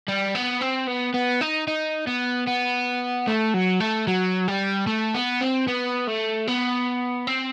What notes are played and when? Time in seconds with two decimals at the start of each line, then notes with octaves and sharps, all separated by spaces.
0.08 G3
0.35 B3
0.61 C4
0.88 B3
1.14 B3
1.41 D#4
1.67 D#4
2.07 B3
2.47 B3
3.28 A3
3.54 F#3
3.80 A3
4.07 F#3
4.48 G3
4.87 A3
5.14 B3
5.41 C4
5.68 B3
6.08 A3
6.47 B3
7.27 C4